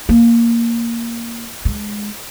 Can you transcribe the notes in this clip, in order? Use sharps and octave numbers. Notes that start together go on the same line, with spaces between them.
A#3
G#3